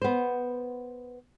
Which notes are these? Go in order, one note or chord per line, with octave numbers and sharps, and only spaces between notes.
B3 C5